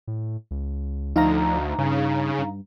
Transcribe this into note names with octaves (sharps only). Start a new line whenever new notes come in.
A2
C#2
D2 F3 D#4 F5 A#5
G2 C#3
G2